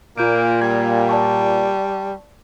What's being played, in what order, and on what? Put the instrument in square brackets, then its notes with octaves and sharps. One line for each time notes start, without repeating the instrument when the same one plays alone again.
[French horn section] A#2 [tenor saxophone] A#3 [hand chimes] F4 G6 D7
[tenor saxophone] G3 [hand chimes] G#6
[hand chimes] D5 A5 C#6